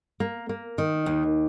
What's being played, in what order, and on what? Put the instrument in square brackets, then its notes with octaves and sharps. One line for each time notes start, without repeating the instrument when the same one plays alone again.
[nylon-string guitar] A#3
A#3
D#3
D#2